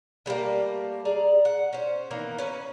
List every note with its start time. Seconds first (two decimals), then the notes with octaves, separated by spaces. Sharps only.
0.26 D3 G3 A3 A#3
1.05 G#4 D5 A#5
1.45 F#5
1.73 C#4 C5
2.11 D#3 E3 A#3 B3
2.38 C#4 B4